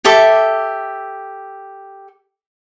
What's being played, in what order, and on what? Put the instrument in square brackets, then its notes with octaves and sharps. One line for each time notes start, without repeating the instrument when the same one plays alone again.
[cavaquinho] G4 A4 E5 D6